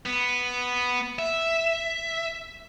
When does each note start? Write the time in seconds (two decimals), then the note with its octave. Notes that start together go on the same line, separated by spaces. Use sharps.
0.06 B3
1.19 E5